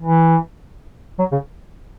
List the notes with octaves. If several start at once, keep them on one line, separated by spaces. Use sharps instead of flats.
E3
F#3
C#3